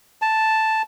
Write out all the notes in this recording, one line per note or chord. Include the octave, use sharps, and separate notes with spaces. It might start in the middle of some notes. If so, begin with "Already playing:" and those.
A5